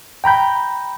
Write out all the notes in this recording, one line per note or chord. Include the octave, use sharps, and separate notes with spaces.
G5 A#5 B5 G6